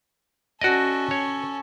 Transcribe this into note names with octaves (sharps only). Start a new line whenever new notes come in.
C#4 F#4 A4 D5 D#5
C#5